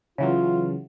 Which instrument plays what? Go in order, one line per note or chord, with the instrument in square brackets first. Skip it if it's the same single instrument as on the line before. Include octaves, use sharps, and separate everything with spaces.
[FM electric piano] C#3 E3 F#3 [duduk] F4